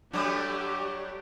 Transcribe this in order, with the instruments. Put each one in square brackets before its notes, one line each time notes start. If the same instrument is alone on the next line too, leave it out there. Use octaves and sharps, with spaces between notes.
[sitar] F#3 G3 A3 [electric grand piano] D4 C#5 [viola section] G4 [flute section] D6